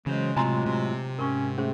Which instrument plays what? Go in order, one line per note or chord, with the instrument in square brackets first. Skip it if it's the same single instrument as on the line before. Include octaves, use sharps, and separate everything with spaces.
[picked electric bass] C#3 [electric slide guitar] E3 F#3 C5 [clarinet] G#3
[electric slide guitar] A2 F#3 F4 [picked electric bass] C3 [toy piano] G#5 A#5 C6
[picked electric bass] C3
[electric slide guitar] G#2 [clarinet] C#4 [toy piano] A#4 C#6
[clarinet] A3 [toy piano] C#4 G#4 C5